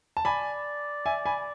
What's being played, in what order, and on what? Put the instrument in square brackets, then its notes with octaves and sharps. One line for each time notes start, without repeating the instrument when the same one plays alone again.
[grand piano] A5
[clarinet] D5 [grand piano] G#5 B5
[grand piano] E5 G#5
G#5 B5